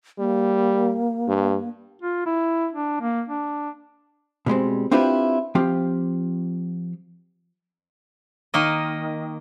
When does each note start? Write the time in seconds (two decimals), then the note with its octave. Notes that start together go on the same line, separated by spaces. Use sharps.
0.19 G3 A#3
1.28 G2
2.02 F4
2.26 E4
2.73 D4
3.01 A#3
3.28 D4
4.46 B2 G3 G#3 C4
4.91 C4 D4 E4 F4 G4 B4
5.55 F3 C4 F4 G4
8.54 D#3 A#3 D#5